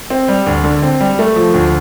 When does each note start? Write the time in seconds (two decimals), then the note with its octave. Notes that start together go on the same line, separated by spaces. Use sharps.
0.10 C4
0.29 G3
0.47 D2
0.64 D3
0.82 C4
1.00 G3
1.19 A3
1.36 F3
1.54 D2